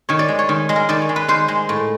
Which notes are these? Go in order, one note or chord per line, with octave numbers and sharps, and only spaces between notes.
D#3 C#5
D5
G#3
C#5
D#3
G#3
A#4
D#3 D5
C#5
G#3
B4
D#3 C5
G#3
A2